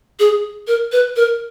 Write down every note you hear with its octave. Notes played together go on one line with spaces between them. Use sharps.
G#4
A#4
B4
A#4